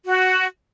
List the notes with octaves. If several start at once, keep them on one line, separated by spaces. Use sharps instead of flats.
F#4